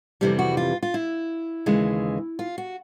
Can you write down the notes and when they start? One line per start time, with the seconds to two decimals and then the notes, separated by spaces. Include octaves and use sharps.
0.21 F2 C3 E3 G3 C4
0.39 F#4
0.57 F4
0.83 F4
0.94 E4
1.66 D#2 C#3 E3 G#3
2.39 F4
2.58 F#4